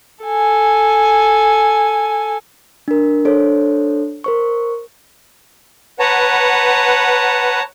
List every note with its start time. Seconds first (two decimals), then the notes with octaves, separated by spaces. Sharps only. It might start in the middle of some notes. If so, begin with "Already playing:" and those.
0.25 A4 G#5
2.88 D4 A#4
3.25 D4 A4 C5 C#5
4.24 A#4 C5 C#6
5.99 B4 C#5 F#5 A5 A#5